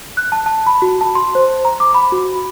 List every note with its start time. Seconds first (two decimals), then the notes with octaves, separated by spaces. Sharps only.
0.17 F#6
0.32 A5
0.46 A5
0.67 B5
0.82 F#4
1.01 A5
1.15 C6
1.35 C5
1.65 A#5
1.80 D6
1.94 B5
2.12 F#4